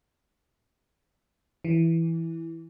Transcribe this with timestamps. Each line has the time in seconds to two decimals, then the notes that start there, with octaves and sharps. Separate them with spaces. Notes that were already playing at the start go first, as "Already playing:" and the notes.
1.65 E3